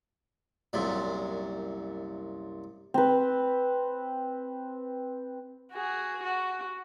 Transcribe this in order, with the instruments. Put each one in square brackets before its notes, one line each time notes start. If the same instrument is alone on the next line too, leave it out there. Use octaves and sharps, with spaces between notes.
[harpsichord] C2 F#2 A#2
[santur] C4 B4
[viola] F#4 G#4
F#4